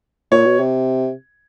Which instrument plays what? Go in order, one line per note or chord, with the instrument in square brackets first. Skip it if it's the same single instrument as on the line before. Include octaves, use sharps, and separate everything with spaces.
[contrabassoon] A#2 [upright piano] C#5
[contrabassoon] B2
C3